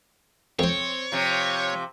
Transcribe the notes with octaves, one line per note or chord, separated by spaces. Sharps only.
F2 C4 C5 C#5
C3 F3